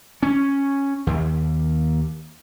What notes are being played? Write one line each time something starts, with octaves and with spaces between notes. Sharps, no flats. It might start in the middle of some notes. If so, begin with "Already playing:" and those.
C#4
D#2